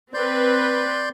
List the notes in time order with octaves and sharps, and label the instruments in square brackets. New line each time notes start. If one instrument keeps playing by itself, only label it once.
[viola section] C4 B4 [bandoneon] D5 C6 G6